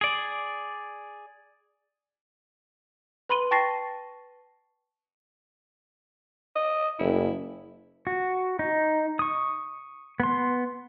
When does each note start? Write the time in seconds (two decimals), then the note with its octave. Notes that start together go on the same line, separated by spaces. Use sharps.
0.01 G#4 D5
3.29 B4 B5 C6 D#7 G7
3.51 G5 A5 C#6 A6 A#6 C7
6.56 D#5
6.99 F#1 E4
8.07 F#4
8.59 D#4
9.19 C#6 D#6
10.20 B3 C6